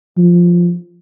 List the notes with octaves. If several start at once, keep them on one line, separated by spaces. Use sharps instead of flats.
F3